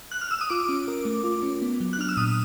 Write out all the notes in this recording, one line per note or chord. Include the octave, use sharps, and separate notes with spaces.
F#6
F6
E6
D#6
F4 D6
C#4
A#4
A3
F4
C#4
B3
F#3
F#6
D4 F6
E6
A#2 D#6